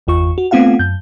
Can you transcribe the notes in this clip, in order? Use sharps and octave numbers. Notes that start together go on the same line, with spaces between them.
G1 E2 F4 C#6
F#4
A3 B3 C4 F4 F5 F#5
F#2 G6